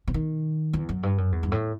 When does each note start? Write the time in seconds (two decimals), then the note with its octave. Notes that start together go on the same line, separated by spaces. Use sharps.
0.08 C3
0.14 D#3
0.73 E2
0.89 F#2
1.03 G2
1.18 F#2
1.32 E2
1.43 G2
1.52 A2